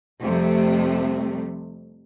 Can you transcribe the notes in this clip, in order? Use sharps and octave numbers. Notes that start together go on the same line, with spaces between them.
F2 C3 F3 G3 A3